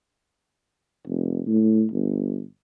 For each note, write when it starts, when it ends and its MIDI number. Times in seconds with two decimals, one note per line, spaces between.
1.07 1.42 29
1.47 1.85 45
1.92 2.43 31